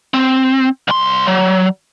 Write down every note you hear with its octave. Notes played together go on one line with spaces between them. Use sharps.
C4
C2 C6
F#3